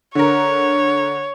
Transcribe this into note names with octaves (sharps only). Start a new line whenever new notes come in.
D3 A#4 C#5